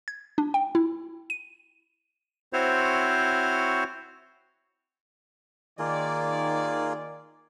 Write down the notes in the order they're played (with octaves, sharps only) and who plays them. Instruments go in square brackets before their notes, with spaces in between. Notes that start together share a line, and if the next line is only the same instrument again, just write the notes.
[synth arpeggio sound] G#6
D4
G5
E4
D#7
[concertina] C4 E4 F#4 C5 C#5
[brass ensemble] D#3 D5 [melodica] A#3 F4 G#4